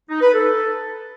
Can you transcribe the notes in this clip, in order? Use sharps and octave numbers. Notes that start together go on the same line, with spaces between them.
D#4
B4
A4